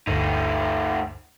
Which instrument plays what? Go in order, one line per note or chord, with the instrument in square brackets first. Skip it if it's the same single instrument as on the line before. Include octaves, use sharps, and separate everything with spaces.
[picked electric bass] G1 D2 [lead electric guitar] A3 D#4